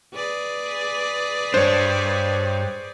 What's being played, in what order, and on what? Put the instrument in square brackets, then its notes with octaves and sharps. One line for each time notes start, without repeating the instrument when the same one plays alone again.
[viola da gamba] G#4 B4 D5
[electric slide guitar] G2 D4 [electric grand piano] C5 C#5